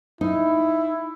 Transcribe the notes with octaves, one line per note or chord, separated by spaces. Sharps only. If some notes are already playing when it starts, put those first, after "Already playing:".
D#4 E4